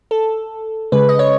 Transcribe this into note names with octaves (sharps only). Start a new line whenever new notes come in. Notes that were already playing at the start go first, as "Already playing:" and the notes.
A4
C#3 G#3 B4
D#5
C#5